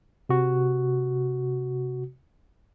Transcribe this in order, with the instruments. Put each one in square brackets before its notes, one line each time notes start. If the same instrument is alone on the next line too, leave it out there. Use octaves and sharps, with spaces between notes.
[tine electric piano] C3 F#4